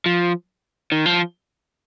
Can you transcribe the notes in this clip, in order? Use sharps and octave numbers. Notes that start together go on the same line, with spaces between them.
F3
D#3
F3